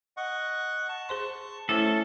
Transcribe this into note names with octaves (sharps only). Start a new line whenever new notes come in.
D#5 F#5 C#6
A5 C#6
G#4 C5 C6
A3 C#4 E4 A4 C5 E5